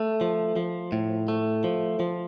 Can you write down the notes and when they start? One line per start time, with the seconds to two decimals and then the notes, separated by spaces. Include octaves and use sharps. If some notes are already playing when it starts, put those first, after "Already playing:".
Already playing: A3
0.21 F3
0.56 F3
0.92 A2
1.28 A3
1.64 F3
2.00 F3